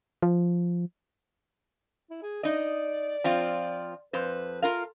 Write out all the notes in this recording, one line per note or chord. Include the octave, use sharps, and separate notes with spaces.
F3
E4
G#4
D#4 D5 D#5
F3 C4 F4
F2 B4 C5
F4 A4 A#4 F5